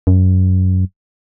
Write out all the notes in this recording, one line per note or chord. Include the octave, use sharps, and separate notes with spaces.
F#2